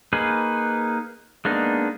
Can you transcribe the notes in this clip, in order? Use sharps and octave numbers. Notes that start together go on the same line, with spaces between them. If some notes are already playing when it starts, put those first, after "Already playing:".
A#3 D#4 G#4 B4
G#3 A#3 B3 D4 D#4